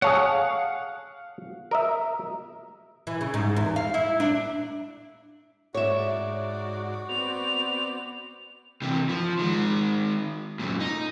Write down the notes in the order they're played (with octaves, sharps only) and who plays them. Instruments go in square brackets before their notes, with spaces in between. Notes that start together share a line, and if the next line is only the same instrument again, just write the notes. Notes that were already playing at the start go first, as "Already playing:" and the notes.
[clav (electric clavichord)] G#4 A4 C#5 [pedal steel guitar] F5 F#5
[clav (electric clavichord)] A#4 D#5 E5
[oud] E3
C#3
G#2
E2
F5
E4
D4
[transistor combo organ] G#2 D5 [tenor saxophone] F#4 [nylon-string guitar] C#5 E5
[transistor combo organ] B3 C4 D5 [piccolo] F7
[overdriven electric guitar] C3 E3
F3
D#3 G#3
F#2 A#2
D#4